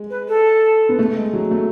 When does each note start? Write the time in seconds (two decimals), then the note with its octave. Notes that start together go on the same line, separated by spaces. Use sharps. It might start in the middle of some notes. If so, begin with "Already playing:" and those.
Already playing: G#3
0.10 B4
0.28 A4
0.89 B3
0.99 A3
1.16 G#3
1.33 F#3
1.51 A3